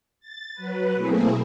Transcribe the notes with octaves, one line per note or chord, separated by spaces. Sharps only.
A6
F#3 B4
B2 A3 A#3 C4 E4 G#4